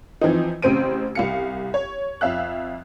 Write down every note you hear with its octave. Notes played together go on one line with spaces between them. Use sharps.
E3 F3 C4 D#4
A1 C#3 C4 C5 D7 D#7
C2 F5 C#7
C#5
F2 E5 F5 F#6